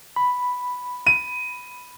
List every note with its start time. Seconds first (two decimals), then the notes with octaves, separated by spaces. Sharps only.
0.16 B5
1.07 D#7